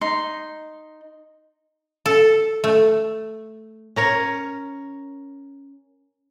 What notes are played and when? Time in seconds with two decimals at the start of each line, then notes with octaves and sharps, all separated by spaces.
0.01 D#4 C6
2.06 A4
2.64 A3
3.96 C#4 A#4 C#5